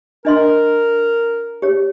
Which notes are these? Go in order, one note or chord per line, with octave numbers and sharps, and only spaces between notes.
D4 A#4 D#5 C6
G4 C#5